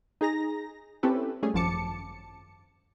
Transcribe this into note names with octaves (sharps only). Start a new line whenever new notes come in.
D#4 G#4 A#5 A#6
C4 C#4 E4 G4 A4 B4
G3 A3 C#4 G#4
G#1 F#2 F3 A5 D6 C#7